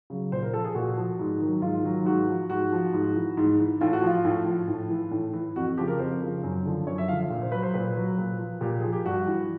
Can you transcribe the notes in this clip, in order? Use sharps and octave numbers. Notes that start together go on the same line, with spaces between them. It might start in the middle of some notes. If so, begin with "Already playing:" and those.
C#3 F#3
A#2 C5
A#4
F3 A4
G#4
A#2 F#4
F3
G#2
D#3 F#3
G#2 F4
D#3 F#3
G#2 F#4
F3
G#2 F#4
F3
G#2
E3
G#2
E3
A2 F4
F#4
F3 F4
A2
F3
A2
E3
A2
E3
F2 F#4
C#3 F3 G4
A#4
F2 C5
C#3 F3
F#2
D3 F3
F#2 C#5
E5
D3 F3 F5
F5
A#2
C5
F#3 B4
C5
A#2 B4
F#3
A#2
F3
A#2 G4
F3 G#4
G4
G2 F#4
E3